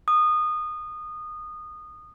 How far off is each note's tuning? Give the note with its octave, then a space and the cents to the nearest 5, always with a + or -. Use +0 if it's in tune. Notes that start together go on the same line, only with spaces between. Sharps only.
D#6 -20